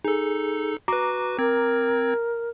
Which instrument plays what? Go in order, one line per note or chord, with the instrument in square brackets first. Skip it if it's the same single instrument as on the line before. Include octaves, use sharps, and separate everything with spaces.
[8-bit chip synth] D#4 A4 [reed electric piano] G#4
[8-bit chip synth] F#4 B4 [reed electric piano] A#5 D6
[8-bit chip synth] C4 G#6 [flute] A#4